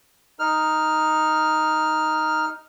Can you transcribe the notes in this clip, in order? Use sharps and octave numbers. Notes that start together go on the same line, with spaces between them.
D#4 F6